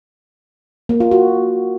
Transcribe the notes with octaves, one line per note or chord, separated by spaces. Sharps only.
A#3
F4
F#4